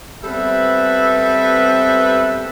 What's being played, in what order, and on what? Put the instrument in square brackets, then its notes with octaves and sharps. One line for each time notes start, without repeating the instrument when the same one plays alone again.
[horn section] G3 B3 C4 A4 B4 E5